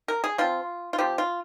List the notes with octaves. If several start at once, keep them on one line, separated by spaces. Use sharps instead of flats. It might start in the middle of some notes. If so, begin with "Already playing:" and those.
A#4
G#4
F3 C4 F4
F4
F3 C4 G4
F4